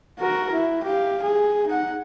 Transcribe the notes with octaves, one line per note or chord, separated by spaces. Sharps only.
F#4 A#4
E4
G4 F5
G#4
D#4 F#5